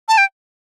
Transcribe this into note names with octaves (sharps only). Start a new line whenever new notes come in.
A5
G5